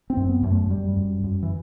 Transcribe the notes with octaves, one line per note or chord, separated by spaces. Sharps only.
C4
F#2
B3
F#2
A3
F#2 G3
F#2
F#2
E3